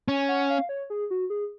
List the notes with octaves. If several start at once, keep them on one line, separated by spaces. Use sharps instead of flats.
C#4 G#5
F#5
F5
C#5
G#4
F#4
G#4